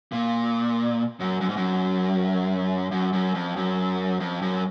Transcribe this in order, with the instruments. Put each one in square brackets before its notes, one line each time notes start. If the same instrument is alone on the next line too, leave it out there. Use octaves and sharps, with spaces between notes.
[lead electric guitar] A#2
F#2
F#2
G#2
F#2
F#2
F#2
F2
F#2
F2
F#2